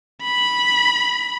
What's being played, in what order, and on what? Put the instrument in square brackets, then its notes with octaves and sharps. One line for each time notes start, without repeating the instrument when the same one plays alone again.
[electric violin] B5